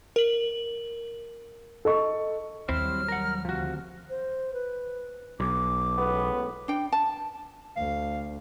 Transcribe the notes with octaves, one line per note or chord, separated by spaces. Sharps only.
A#4 F#7
A4 D#5 C#6
D#2 F#3 G3 C4 E4 C5 F6
A#4 F#5
D2 C3 F3 F#4
C5
B4
B1 D6
C#2 A2 B3
D4 G5
A5
D2 F5